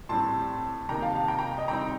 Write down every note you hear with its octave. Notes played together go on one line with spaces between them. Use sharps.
A2 G3 C4 A5 C6
C3 D#3 A#3 D#4 G5 A#5
F5 A5
F5 A5
G5 A#5
G5 A#5
D#5 G5
C3 G3 C4 D#4 G5 A#5